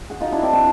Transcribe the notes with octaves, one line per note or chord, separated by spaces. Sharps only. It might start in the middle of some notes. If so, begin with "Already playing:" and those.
F#4 G#4
D#4 F4
D4 E4
C4 D4
C4 D4